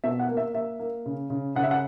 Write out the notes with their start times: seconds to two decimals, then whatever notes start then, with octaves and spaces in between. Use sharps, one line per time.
0.04 B2 E5
0.20 F#5
0.29 A#3
0.37 E5
0.54 A#3 E5
0.79 A#3
1.06 C#3
1.30 C#3
1.55 C#3 F#5
1.63 E5
1.71 F#5